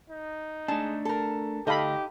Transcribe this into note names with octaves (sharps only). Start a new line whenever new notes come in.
D#4
G#3 A3 D4 A5
A4 A#4
D2 D#4 G4 A4 D#5 F5 B5